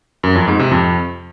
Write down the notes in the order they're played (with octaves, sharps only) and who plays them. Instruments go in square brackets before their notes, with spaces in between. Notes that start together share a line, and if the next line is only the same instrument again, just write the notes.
[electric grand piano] F#2
F2
G#2
C3
F2